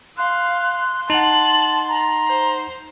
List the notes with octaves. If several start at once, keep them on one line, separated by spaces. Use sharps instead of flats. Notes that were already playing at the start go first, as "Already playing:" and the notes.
F5 C6 F#6
D#4 F#5 A5 F#7
A#5
C5